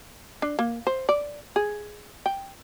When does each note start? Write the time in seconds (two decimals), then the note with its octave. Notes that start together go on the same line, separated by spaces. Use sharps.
0.42 D4
0.59 A#3
0.87 C5
1.09 D5
1.56 G#4
2.26 G5